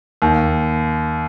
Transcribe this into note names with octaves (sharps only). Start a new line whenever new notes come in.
D#2